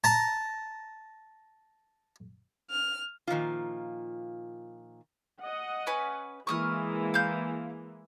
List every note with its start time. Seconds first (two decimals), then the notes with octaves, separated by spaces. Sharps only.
0.04 A5 A#5
2.70 F6
3.27 A#2 D#3 F3 F4
5.39 D#5 F#5
5.87 C#4 B4 G#5
6.47 E3 G#3 A#3 C#6 D#6 F6
7.14 F5 G6